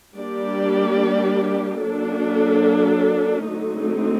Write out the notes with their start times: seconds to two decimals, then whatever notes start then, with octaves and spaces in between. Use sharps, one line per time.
0.17 G3 A#3 D4 G4 D5
1.84 F#3 A#3 D4 A4
3.49 D3 F#3 A3 C4 D#4